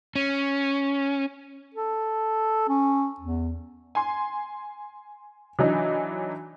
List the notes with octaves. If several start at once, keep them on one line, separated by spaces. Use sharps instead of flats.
C#4
A4
C#4
E2
G#5 C6
E3 F#3 D4 D#4